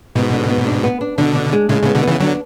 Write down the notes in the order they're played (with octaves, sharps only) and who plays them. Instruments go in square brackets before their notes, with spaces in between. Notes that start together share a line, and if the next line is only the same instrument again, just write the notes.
[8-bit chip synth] G#2 B2 [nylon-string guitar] B3
[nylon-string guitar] D3
B3
D4
B3
D4
[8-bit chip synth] B2 D3 [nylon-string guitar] D4
[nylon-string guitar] D4
G#3
[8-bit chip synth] A2 C#3 [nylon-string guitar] G#3
[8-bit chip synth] A2 C#3 [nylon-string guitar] B3
[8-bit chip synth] B2 D3
[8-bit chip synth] C#3 E3 [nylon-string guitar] B3
[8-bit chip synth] D3 F#3 [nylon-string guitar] D4